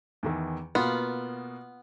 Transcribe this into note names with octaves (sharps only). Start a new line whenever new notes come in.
E2 D#3 E3
B2 A#3 B3 F4